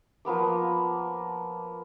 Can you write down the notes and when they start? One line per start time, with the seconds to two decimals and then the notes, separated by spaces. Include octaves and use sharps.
0.25 F3 A#3 B3 D6